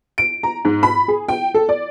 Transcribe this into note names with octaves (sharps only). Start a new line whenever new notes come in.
D7
A#5
G#2
B5
G#4
G5
A4
D5